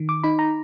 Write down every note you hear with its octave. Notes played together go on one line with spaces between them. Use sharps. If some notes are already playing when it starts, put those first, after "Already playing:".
Already playing: D#3
D6
D#4 B5
A#5